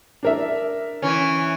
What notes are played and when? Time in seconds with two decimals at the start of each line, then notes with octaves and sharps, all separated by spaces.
0.23 D4 A#4 E5
1.02 E3 C#4